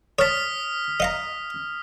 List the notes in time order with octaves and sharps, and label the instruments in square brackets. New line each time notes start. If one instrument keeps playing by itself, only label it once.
[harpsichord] C#5 A5 [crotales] D#6 F6 B6
[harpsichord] D#5 F5 A#5